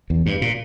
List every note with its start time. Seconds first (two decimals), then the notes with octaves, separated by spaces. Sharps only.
0.10 E2
0.26 G2
0.42 A#2